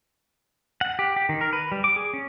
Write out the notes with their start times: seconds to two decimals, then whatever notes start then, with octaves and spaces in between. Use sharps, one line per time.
0.81 F#5
0.99 G4
1.16 G4
1.29 D#3
1.41 A#4
1.53 B4
1.72 G3
1.84 D6
1.96 G#4
2.13 C#4